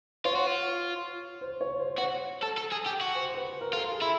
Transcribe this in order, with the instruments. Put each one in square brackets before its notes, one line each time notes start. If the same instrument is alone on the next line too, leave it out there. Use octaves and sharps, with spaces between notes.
[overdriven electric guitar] F4 [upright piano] C#5
[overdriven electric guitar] F#4
F4
[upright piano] C5
C#5
C5
[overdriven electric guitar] F#4 [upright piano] C#5
[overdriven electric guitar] A4
A4
G#4
G4
F#4
[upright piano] C5
B4
A#4
[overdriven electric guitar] F4 [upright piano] A4
[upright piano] G#4
[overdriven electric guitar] E4